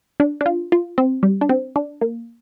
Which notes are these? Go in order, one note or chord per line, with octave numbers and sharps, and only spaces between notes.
D4
D4
F4
F4
C4
G3
D4
C4
D4
A#3